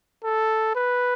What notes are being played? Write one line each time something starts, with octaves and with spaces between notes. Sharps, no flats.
A4
B4